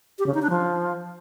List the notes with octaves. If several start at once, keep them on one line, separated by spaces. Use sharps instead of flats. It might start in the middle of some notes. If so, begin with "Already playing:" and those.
G4
C#3
D#4
D4
F3